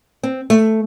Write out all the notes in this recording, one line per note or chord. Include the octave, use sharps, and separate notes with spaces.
C4
A3